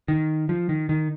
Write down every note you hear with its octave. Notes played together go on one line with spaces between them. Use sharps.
D#3
F3
D#3
D#3